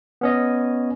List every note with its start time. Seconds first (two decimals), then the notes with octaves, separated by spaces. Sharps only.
0.21 B3 C#4 D#5